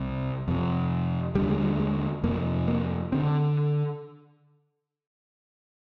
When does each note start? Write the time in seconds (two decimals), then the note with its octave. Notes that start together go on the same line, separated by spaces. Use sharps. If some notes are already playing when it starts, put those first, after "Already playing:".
Already playing: C2 C3
0.48 F2 C3
1.35 D#2 D3 G3
1.49 G#3
1.62 G3
1.80 G#3
2.24 F2 C3 A#3
2.68 A#3
3.12 D3 C4